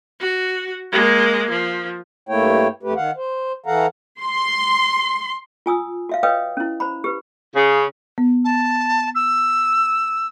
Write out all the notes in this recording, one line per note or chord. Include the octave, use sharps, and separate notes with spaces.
F#4
G#3 A#3
F3
G2 A3 A#3 E4 C#5 G5
F2 A3 G4 B4
D#3 F5 F#5
C5
E3 A4 F5 F#5 A#5
C6
F4 G#5 D#6 E6
F#4 E5 F5
B4 C#5 D#5 F5 G5 D#6
C#4 E4
C5 A#5 B5
G4 B4
C#3
B3
A5
E6